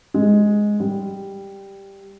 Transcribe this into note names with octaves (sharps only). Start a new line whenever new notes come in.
G#3
G3